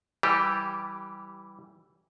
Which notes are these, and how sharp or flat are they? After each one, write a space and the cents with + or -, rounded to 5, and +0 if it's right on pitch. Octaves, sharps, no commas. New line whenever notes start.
E3 +0 G3 -15 G4 +0